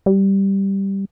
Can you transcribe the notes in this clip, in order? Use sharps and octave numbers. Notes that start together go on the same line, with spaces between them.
G3